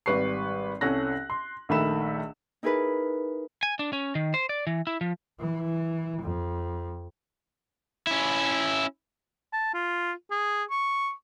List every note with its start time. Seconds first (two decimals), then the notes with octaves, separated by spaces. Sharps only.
0.06 G#1 G3 B4 C#6 C7
0.81 C2 C#4 A4 F#6 A#6
1.30 C6
1.69 A#1 D#3 A3 E5 B5 E7
2.63 D#4 E4 G#4 A#4 B4
3.63 G#5
3.79 D4
3.93 C#4
4.15 D#3
4.34 C5
4.49 D5
4.67 E3
4.87 E4
5.01 F3
5.40 E3
6.22 F2
8.07 C#4 E4
9.53 A5
9.74 F4
10.31 G#4
10.71 C#6